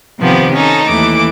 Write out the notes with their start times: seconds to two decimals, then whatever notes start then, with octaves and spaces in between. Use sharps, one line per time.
0.18 C3 D#3 F3 B3 G4
0.54 C#4 D#4 A4
0.87 D#2 E3 A3 D6